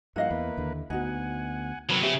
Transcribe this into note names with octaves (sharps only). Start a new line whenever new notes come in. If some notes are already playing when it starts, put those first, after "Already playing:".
G2 F3 A#3 E4 D#5 F5 F#5
E2 A#3 B4
D#2 D3
D2 B3 D#4 F#4 F#5 G#5
C3 F#3 A#4 C5 B5
C#3 F3 B3 C#4 G4 E5